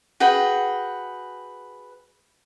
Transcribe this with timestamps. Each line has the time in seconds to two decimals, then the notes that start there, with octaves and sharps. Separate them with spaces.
0.20 F#4 G#4 B4 G5